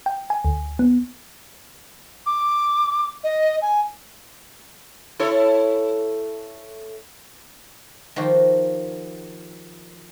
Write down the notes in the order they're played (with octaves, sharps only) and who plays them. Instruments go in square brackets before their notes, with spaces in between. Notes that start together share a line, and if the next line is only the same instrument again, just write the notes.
[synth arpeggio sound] G5
G#5
D2
B3
[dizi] D6
D#5
G#5
[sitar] E4 A4 C#5
[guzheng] D#3 F3 F#4 G4